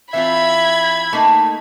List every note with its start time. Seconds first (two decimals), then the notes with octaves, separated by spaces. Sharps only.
0.14 E3 C4 F4 E5 B5 G#6
1.13 A3 A#3 D#4